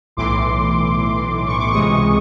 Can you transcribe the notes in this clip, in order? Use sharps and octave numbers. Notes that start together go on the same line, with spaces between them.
B1 A2 E3 C6 D6
C#6
D6
C#2 C3 E3 G#3 C#6 D#6